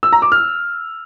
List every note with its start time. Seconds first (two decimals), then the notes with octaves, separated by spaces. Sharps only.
0.03 E6
0.12 A#5
0.22 D6
0.32 F6